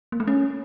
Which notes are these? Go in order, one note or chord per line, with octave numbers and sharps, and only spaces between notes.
A#3
A3
C#4